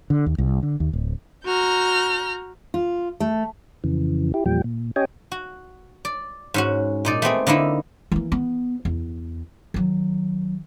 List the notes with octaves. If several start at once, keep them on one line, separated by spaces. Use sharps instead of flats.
D3
D#2
C2
D3
D#2
D1
F#4 A#5 F6 G6
F4
A3
F2 C#3 E3
E4 G4
E2 A#2 F3 G3 G5
A#2
C#4 G4 C#5 D#5 G5 G#5
F#4
D5
G#2 C#4 F#4
A#2 D#4 D5
A3 B3 C4 G#4
D3 A#3 D#4 E4
E3 A#3
B3
E2
D#3 F#3